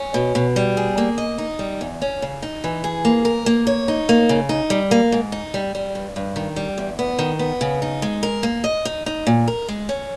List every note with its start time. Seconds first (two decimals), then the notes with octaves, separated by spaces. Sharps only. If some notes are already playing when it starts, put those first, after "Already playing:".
Already playing: C#4
0.14 B2
0.35 B2
0.56 G3
0.77 G#4
0.98 A#3
1.18 D#5
1.38 D#4
1.59 G3
1.81 E2
2.02 C#4
2.22 C#3
2.42 D#4
2.64 E3
2.84 G#4
3.05 A#3
3.25 A#4
3.46 A#3
3.67 C#5
3.88 D#4
4.09 A#3
4.29 C#3
4.49 D#4
4.70 G3
4.91 A#3
5.12 G#2
5.32 D#4
5.54 G3
5.75 G3
5.95 G2
6.16 G2
6.36 D#3
6.56 G3
6.78 E2
6.99 B3
7.19 D#3
7.39 B3
7.61 C#3
7.82 D#4
8.02 G#3
8.23 A#4
8.43 A#3
8.64 D#5
8.85 D#4
9.06 D#4
9.27 A#2
9.48 A#4
9.69 G#3
9.89 C#4